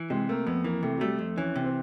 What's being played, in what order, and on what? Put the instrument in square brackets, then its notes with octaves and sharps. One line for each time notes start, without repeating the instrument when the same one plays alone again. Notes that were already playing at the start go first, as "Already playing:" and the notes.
Already playing: [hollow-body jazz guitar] E3
[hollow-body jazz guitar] C3 [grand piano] G#3
[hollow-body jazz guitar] A3 [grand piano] A#3
[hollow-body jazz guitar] F2 [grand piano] B3
[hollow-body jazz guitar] E3 [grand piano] A#3
[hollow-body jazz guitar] C3 [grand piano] A3
[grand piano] F#3
[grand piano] G3 [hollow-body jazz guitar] A3
[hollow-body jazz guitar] F2
[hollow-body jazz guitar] E3 [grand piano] C#4
[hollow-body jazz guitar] C3
[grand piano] C4